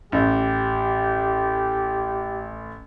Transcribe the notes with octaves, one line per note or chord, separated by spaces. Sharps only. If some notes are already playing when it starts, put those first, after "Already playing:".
A1 G4